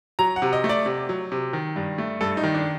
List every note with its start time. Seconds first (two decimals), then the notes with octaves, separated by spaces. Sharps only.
0.19 F#3 A#5
0.36 F#5
0.42 C3
0.53 D#5
0.64 A3
0.69 D5
0.86 C3
1.09 F#3
1.32 C3
1.53 D#3
1.76 G2
1.98 A3
2.21 G2 A4
2.37 D#4
2.44 D#3
2.54 D4